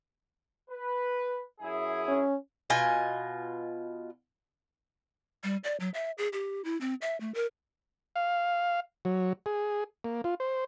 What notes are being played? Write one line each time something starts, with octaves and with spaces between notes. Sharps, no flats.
B4
F#2 E4 G#4
C#4
B2 F4 D#5 G#5
G3
D5
F#3
E5
G#4
G4
E4
C4
E5
A3
A#4
F5
F#3
G#4
A#3
F4
C5